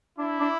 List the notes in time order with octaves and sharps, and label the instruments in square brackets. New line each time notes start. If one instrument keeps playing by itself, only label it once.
[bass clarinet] D4 [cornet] E4
[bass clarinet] D4